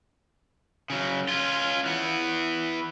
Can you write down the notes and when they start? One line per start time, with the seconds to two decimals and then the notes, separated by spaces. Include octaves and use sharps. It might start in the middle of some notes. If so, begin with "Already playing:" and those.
0.90 C#3 F#3
1.29 C#4 F4
1.86 E3 B3